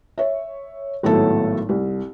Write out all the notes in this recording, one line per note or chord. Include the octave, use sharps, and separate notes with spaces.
C#5 E5
G#1 A2 F#3 A3 B3 A4
C2